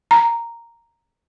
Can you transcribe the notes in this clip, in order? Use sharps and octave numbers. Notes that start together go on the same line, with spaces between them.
A#5